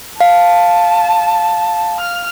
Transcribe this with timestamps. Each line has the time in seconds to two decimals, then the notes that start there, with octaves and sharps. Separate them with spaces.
0.21 F5 A5
2.00 F6